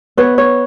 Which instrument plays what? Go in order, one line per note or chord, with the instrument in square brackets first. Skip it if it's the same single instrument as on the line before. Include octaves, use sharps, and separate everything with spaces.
[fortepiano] B3 [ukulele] C#5
[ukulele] C#5